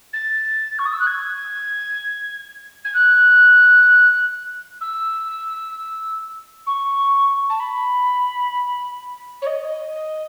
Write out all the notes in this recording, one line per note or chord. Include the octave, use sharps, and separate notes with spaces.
A6
C#6
D#6
E6
F#6
G#6
G#6
F#6
E6
C#6
A5
B5
C#5
D#5